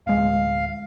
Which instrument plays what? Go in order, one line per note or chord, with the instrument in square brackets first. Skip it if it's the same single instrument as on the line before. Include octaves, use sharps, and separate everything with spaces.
[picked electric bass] D1 G#3 [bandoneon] F5